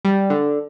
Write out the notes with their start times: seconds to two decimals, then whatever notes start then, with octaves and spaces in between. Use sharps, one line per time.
0.05 G3
0.30 D3